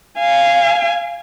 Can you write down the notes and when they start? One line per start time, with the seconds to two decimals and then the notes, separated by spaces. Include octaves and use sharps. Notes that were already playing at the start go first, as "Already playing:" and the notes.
0.19 F5 G#5